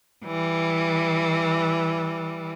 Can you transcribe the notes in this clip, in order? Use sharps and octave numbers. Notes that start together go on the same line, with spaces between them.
E3 G3